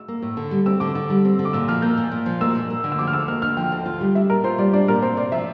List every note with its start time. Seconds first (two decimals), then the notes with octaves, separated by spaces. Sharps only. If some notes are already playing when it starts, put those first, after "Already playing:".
Already playing: E6
0.08 A#3
0.22 A2
0.37 D3
0.51 G3
0.66 C4 E6
0.80 D3 D6
0.95 D3 E6
1.10 G3
1.25 C4
1.39 D3
1.45 D6
1.53 A#2 E6
1.68 F3 F6
1.82 A#3 G6
1.98 A#2
2.11 A#2
2.26 F3
2.41 A#3 E6
2.55 A#2
2.70 A#3
2.84 D3
2.92 E6
2.99 F3 D6
3.07 F6
3.13 D2 E6
3.28 A#3 F6
3.42 D3 F6
3.57 F3 G5
3.72 D2
3.86 F4
4.01 G3
4.15 D4 E5
4.30 A#2 A#4
4.44 F4 C5
4.58 G3 D5
4.73 D4 D5
4.88 A#2 A#4
5.02 C4 C5
5.17 C3 D5
5.32 F3 E5